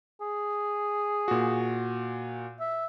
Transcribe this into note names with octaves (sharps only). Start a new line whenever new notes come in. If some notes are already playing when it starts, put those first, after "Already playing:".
G#4
A#2 F#4
E5